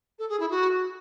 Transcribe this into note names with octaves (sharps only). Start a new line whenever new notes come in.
A4
G#4
E4
F#4